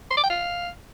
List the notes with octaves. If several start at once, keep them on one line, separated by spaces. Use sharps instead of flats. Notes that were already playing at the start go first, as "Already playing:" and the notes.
C6
D6
G5
F5